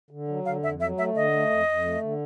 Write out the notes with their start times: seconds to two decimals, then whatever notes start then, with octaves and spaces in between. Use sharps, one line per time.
0.10 D3
0.28 F#3
0.45 D3 F5
0.63 F2 E5
0.80 F#3 E5
0.97 A3 E5
1.15 D3 D#5
1.33 A3
1.50 F2
1.67 F2
1.85 A3
2.02 D3